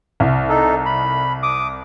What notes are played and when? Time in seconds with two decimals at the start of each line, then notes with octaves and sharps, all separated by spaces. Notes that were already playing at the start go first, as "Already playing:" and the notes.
0.20 C2
0.49 D#4 A4
0.86 B5
1.43 D6 D#6